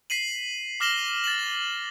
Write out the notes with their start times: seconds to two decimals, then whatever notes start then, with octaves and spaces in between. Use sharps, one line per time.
0.10 B6 C7 D#7 F#7
0.80 D6 F6 A#6 E7 F#7 G7
1.24 A6 E7 F#7